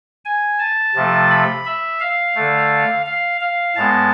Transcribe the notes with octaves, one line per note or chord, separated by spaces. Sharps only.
G#5
A5
C3 F3 A3
B5
E5
F5
D3 A3
F5
F5
A2 G#3 B3 A5